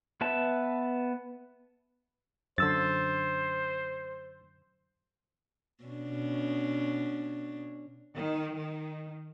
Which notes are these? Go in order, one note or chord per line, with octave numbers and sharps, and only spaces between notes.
B3 B4 E5 A5
F#2 D3 C5 E6 A6
B2 C#4 D4
D#3
D#3